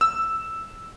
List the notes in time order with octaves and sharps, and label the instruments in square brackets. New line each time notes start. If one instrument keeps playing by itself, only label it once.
[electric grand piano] E6